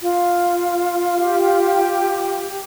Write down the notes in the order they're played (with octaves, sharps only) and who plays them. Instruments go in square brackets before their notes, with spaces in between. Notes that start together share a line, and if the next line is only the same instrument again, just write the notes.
[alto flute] F4
[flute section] G4